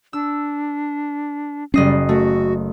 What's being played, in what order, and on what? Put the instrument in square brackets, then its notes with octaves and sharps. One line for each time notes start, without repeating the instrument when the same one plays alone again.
[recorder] D4 [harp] E6
[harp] F#1 D#5 C7 [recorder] G3 [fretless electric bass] C#4
[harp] A3 [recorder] F#4